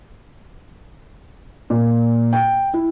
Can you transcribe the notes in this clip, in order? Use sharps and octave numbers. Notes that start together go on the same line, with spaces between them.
A#2
G5
E4